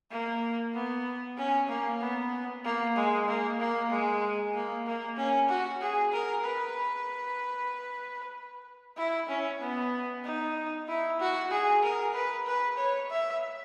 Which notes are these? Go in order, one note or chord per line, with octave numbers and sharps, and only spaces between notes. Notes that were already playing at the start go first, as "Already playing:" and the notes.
A#3
B3
C#4
A#3
B3
A#3
G#3
A#3
A#3
G#3
A#3
A#3
C#4
F#4
G#4
A#4
B4
E4
C#4
B3
D#4
E4
F#4
G#4
A#4
B4
B4
C#5
E5